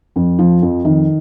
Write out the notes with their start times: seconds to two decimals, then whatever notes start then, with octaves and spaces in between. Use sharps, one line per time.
0.16 F2
0.39 F3
0.62 F2
0.85 D#3